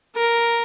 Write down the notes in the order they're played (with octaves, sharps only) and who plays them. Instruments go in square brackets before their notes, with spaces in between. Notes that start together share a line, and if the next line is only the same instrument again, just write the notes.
[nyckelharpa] A#4